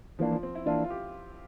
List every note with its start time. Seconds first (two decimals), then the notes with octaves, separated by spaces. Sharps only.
0.19 E3 F3 A#3 D4
0.31 F3
0.43 C4
0.55 E4
0.66 E3 A#3 D4 F4
0.84 F4
0.90 G4